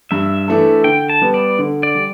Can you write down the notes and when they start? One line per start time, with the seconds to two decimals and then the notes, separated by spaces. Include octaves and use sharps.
0.11 G2 E5
0.48 E3 A3 D4 A4
0.84 D3 G5
1.09 A5
1.22 G3 B3
1.34 D5
1.59 D3
1.83 D5
1.95 G3